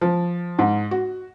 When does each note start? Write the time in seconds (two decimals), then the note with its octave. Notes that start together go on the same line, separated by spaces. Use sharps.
0.01 F3
0.59 G#2
0.91 F#4